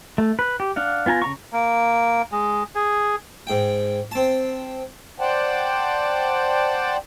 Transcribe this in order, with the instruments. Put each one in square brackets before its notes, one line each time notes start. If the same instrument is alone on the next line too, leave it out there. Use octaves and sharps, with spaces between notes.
[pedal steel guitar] A3
B4
G4
D4 F5 F#5
B3 F4 G#5 A#5
C#3 A#5 C#6
[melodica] A#3
G#3
G#4
[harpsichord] G#2 G5
C4 A5
[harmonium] C5 D5 F#5 G5 A5